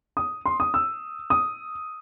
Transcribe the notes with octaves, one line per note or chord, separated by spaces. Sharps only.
D#6
C6
D#6
E6
D#6